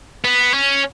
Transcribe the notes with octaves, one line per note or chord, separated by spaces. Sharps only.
B3
C#4